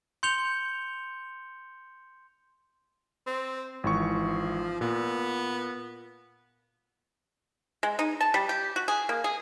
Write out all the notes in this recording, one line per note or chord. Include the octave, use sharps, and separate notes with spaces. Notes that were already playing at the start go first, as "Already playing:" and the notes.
C6 G6 C#7 F7 G7
C4
G#1 E3 F3 C#6
A#2 B3
G#3
D#4
A5
G3
G4
F#4
G#4
A#3
G#4